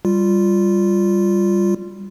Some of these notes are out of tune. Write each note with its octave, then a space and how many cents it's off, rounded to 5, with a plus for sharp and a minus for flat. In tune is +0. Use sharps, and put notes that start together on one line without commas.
G3 +5 F4 +0